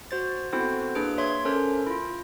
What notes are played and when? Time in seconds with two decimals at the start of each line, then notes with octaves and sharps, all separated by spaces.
0.11 F#4 C5 A6
0.53 B3 C4 E4 F#4 A4 C5
0.95 A#3 D4 G#4 B4 D7
1.18 C#5 E5 C6 G#6
1.45 C#4 A4 A#4 C5
1.87 E4 F4